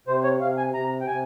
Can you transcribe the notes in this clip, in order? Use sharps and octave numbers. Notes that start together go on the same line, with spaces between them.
C3 C5
C#5
C3 F5
G#5
C3 A#5
G5
C3 G#5